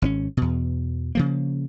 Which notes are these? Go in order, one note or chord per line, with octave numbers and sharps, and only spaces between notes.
G#1 C4 C#4
E2 B2
C#3 F3 A#3